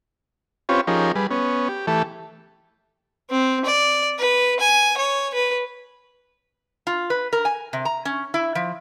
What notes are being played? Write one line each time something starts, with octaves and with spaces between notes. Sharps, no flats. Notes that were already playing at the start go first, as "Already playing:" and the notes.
C4 C#4 F4 G4 B4 C#5
F3 C#4 D#4 G4 G#4 A#4
G3 G#4 B4
B3 C#4
G4
E3 A3 G4 A4
C4
D5
B4
G#5
C#5
B4
F4
B4
A#4
G#5
C3
A#5
C#4
E4
F3